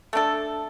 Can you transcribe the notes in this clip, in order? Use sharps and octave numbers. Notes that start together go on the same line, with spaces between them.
A3 D4 A4